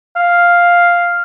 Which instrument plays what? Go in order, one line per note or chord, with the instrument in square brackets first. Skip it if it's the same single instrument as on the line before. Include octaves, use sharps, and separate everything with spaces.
[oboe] F5